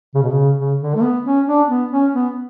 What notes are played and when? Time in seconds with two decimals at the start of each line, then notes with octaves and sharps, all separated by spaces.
0.15 C#3
0.23 B2
0.31 C#3
0.59 C#3
0.81 D3
0.95 A3
1.03 B3
1.25 C#4
1.47 D4
1.69 B3
1.92 C#4
2.14 B3